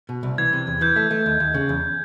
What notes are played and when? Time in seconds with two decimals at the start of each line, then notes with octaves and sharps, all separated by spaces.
0.09 B2
0.23 C2
0.38 E3 G#6
0.53 C3
0.67 E2
0.81 E3 G6
0.96 A3
1.11 A3
1.26 D#2
1.40 D#2
1.54 C#3
1.69 E2